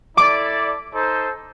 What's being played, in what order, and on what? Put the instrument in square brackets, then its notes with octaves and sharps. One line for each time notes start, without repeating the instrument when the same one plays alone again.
[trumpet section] E4 A4 D5 [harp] D6
[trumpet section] D#4 A4 C5